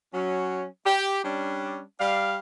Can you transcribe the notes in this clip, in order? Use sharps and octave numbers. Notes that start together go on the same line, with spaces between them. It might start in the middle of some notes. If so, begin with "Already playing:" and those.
F#3 C#4
G4
G3 C#4 D4
G3 D5 F5